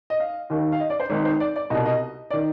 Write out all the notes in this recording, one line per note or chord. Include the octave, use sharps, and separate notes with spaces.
D#5
F5
D#2 D#3
F5
D#5
D5
C5
G#1 G#2 D#3
C5
D5
D5
C2 B2 D#5
D#5
D5
D#3